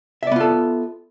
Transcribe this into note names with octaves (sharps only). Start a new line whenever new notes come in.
B3 F4 A4 D5 E5